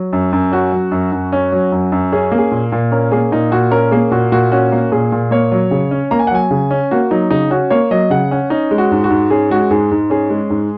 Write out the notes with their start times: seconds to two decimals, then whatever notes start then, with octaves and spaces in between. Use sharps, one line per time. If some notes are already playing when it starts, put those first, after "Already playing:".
Already playing: F#3
0.13 F#2
0.33 F#2
0.52 C#4 F#4
0.72 F#3
0.92 F#2
1.12 F#2
1.33 C#4
1.52 F#3
1.72 F#2
1.92 F#2
2.12 C#4 G#4
2.32 A#3
2.38 G#4
2.51 A#2
2.72 A#2
2.91 C#4 A#4
3.12 A#3 G#4
3.32 A#2 D#4
3.51 A#2 F#4
3.71 C#4 A#4
3.91 A#3 G#4
4.11 A#2 F#4
4.32 A#2 F#4
4.52 C#4 F#4
4.72 A#3
4.91 A#2 G#4
5.12 A#2
5.31 A#3 C#5
5.52 F#3
5.71 C#3
5.91 C#4
6.11 A#3 A#5
6.19 G#5
6.27 F#5
6.31 F#3 G#5
6.51 C#3
6.71 C#4
6.91 A#3 F#4
7.11 F#3 D#4
7.30 C#3 D#4
7.50 C#4 F#4
7.70 A#3 C#5
7.91 F#3 D#5
8.10 C#3 F#5
8.31 C#4 F#5
8.50 C#4 D#4
8.71 G#3
8.78 F#4
8.91 G#2
9.04 F#4
9.10 G#2
9.30 C#4 G#4
9.50 G#3 F#4
9.71 G#2 G#4
9.91 G#2
10.10 C#4 G#4
10.30 G#3
10.50 G#2